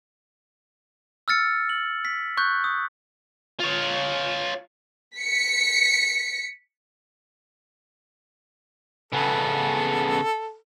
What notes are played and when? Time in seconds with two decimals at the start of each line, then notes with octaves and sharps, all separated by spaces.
1.28 E6 F6 A6 C#7
1.69 F#7
2.05 B6
2.37 C#6 F#6 G6
2.64 D#6
3.60 F4 C#5
5.16 B6 C#7
9.13 C#3 B3 A4